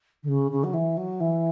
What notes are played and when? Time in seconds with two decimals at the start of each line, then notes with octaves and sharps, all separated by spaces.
0.22 D3
0.28 C#3
0.51 C#3
0.63 F#3
0.73 E3
0.97 F#3
1.20 E3